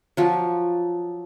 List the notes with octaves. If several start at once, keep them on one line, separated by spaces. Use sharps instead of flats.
F3 F#3